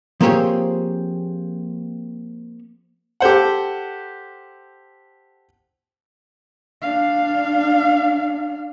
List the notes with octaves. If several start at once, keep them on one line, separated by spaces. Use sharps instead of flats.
F3 A#3 C4 G4 G#4 C#5
G4 A4 C5 F#5
D4 F5